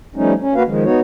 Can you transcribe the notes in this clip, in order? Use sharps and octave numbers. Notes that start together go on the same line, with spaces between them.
F3 G3 A3 C#4 D#4
C#4
A#3 F#4 B4 F5
D#3 F3 G#3
B3 D#4 F#4 C#5